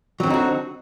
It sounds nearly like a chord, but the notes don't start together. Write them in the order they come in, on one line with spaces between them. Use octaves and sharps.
F#3 C4 D3 D#4 F#4